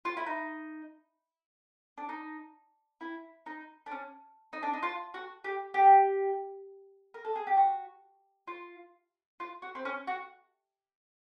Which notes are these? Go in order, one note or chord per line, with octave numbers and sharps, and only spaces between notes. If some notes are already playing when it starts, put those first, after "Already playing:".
F4
E4
D#4
D4
D#4
E4
D#4
D4
C#4
D#4
D4
D#4
F4
F#4
G4
G4
A#4
A4
G#4
G4
F#4
F4
F4
F#4
C4
C#4
F#4